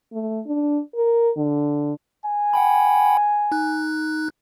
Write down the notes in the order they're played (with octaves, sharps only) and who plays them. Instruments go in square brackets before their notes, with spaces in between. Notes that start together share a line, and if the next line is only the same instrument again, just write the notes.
[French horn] A3
D4
A#4
D3
[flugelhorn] G#5
[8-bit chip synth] F#5 G5 B5
D#4 F#6